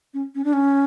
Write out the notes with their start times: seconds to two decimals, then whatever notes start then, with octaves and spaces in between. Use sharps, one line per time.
0.14 C#4
0.35 C#4
0.44 D4
0.53 C#4